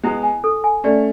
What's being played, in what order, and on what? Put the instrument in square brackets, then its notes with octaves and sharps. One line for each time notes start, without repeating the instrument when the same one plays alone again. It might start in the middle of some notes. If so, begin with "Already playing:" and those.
[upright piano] G#3 B3 [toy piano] E4
[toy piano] G#5
A4
G#5
[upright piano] A3 C#4 [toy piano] D5